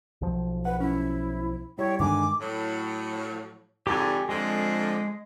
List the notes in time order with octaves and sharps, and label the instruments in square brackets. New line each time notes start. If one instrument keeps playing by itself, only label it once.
[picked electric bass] B1 F3
[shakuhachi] B4 [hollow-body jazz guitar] F#5
[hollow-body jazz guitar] C#4 [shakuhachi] E4
[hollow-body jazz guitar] G3 E4 [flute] C#5 [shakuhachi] G5
[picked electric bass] G2 D#3 G#3 [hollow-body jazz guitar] D3 [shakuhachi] G#5 [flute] D6
[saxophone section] A2 F#3
[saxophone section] F2 G#2 D3 [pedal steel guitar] G4 A4 G#5
[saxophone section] F2 D3 F3 [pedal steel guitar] G#3